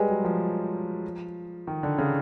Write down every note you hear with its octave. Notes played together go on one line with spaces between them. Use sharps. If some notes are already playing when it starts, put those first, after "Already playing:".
Already playing: G3 G#3 G#4 B4 D#5 G#5
F#3
F3
D#3
D3
C#3